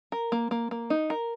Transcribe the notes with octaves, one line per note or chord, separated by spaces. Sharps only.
A#4
A#3
A#3
A#3
D#4
A#4